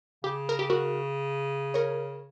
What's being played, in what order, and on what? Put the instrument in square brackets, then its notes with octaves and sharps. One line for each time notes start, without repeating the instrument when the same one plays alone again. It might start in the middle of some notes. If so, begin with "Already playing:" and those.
[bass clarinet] C#3 [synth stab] G4
[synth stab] A#4
G4
F#4 A#4
A#4 C#5